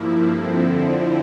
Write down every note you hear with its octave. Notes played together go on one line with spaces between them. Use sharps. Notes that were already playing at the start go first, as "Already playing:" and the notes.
Already playing: G2 F3 A#3 E4
F2 D3 F3 C4 E4